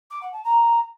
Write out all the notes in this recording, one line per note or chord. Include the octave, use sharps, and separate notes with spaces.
D6
F#5
A5
A#5